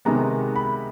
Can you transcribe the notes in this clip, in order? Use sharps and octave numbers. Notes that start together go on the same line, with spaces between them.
C3 D#3 G#3 B3 A#5
B5